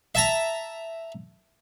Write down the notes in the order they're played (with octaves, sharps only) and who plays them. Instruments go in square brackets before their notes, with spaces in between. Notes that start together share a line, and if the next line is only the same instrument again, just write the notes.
[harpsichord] E5 A5 A#5